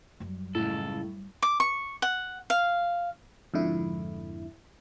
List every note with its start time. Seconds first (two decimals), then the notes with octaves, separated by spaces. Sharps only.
0.20 F#2 G3
0.55 C#2 A2 A4
1.42 D6
1.60 C#6
2.02 F#5
2.50 F5
3.54 F2 G#2 D3 E4